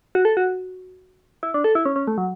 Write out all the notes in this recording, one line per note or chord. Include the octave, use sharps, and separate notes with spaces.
F#4
A4
F#4
E4
D4
A4
E4
C#4
C#4
A3
F#3